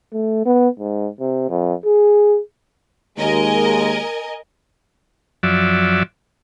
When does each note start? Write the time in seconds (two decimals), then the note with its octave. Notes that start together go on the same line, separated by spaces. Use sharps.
0.13 A3
0.46 B3
0.79 G#2
1.20 C3
1.49 F2
1.85 G#4
3.18 D#2 G#3 A#4 D#5 G#5
5.43 F#2 F3 F#3 D5 E5